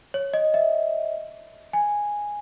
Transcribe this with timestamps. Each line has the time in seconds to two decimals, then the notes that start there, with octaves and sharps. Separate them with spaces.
0.14 C#5
0.34 D#5
0.54 E5
1.73 G#5